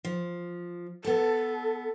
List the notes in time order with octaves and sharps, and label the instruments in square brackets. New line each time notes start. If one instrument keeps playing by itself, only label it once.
[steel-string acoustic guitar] F3
[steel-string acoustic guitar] B3 A5 [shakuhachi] A4